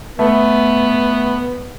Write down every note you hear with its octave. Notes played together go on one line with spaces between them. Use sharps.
A3 B3